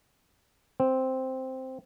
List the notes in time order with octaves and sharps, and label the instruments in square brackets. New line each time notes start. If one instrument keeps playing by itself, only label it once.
[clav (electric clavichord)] C4